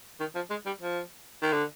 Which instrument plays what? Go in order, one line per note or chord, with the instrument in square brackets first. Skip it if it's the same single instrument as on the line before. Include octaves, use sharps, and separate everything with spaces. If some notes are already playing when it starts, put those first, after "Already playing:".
[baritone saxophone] D#3
F3
G#3
G3
F3
D#3
D3